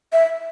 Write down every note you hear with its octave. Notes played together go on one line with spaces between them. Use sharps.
E5